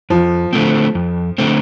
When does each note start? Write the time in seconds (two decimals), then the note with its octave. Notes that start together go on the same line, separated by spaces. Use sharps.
0.10 F2 F3
0.53 D3 A3 C4
0.95 F2
1.38 D3 A3 C4